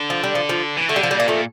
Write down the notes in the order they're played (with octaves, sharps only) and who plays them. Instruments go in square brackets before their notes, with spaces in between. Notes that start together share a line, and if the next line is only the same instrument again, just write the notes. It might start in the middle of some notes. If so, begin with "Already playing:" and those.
Already playing: [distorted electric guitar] D3
[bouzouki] F3
G3
F3
F3
[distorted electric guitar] E3
[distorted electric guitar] D3 [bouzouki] A3
[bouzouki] G3
F3
G3
[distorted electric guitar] A#2 [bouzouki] A#3
[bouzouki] F3 A3